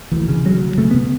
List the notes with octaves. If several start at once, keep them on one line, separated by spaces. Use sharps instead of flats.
D2 E3
C#3
C#3 F#3
D2
C#3 A3
C#3 B3